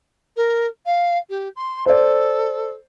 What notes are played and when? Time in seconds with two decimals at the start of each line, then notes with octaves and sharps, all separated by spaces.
0.36 A#4
0.85 F5
1.29 G4
1.55 C6
1.86 A4 C5 D5